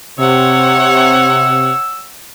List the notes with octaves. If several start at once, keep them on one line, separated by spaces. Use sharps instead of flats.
C3 C#5 F#5 E6